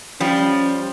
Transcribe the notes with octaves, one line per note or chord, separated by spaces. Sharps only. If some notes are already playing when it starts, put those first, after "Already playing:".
F3 G3 C#4